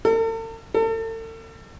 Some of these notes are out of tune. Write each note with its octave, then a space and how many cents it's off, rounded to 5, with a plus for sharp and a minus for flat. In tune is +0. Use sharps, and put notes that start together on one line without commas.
A4 +45
A4 +40